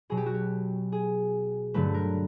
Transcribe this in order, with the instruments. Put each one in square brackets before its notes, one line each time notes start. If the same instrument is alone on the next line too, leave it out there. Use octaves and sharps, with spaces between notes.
[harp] B2 F#3 B3 G#4
G4
F#4
G4
G#4
G2 D3 F#3 A3 B4
A#4